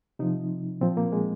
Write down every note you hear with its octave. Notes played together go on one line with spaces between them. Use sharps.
C3 F3 D#4
A#2 F3 C4
A#3
G#3